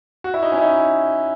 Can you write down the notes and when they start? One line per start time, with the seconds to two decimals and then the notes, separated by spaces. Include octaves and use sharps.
0.24 F#4
0.34 E4
0.43 D#4
0.52 C#4
0.57 E4
0.61 D#4